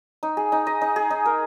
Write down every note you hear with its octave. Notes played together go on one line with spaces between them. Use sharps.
D#4
G#4
D#4
D#5
D#4
G#4
D#4
A#4